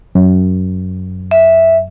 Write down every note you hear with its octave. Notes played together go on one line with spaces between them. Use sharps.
F#2
E5